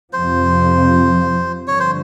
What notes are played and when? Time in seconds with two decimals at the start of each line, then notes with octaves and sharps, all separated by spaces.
0.13 F2 C3 F3 C5
1.67 G2 D3 F3 C#5
1.80 C5